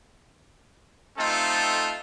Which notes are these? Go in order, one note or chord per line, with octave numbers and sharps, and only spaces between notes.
A3 C4 D#4 F4 A4